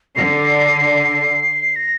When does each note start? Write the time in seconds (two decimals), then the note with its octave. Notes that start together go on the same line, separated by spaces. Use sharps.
0.16 D3 C7
1.76 A#6